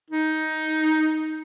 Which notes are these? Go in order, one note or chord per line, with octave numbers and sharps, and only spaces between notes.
D#4